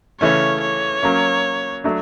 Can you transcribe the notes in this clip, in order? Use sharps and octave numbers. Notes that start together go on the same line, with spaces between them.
C#3 E3 A3 C#4 C#5
C#5
F#3 A#3 C#4
F#3 A3 D4